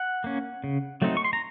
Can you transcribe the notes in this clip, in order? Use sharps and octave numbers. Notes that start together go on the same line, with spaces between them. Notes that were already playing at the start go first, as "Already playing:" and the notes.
Already playing: F#5
A#3 C#4
C#3
F#3 A3 C4 D#4
C#6
C6
A#5